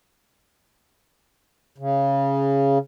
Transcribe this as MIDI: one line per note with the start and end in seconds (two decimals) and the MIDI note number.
1.78 2.78 49